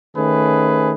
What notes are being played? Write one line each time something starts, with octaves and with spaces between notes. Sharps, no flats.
D#3 A3 C#4 G#4 B4